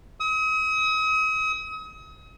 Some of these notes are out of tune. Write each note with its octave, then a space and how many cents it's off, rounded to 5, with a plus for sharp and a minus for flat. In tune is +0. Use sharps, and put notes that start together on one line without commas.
D#6 +40